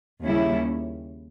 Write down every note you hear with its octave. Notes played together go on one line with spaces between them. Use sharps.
D#2 C#3 G3 C#4 E4